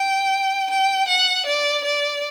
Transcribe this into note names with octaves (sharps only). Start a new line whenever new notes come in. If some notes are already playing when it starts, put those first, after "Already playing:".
Already playing: G5
G5
F#5
D5
D5